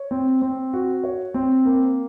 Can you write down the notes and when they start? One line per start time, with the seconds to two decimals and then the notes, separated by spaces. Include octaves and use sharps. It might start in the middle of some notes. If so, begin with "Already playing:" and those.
Already playing: C#5
0.11 C4
0.42 C4
0.73 F#4
1.04 C#5
1.34 C4
1.65 A#3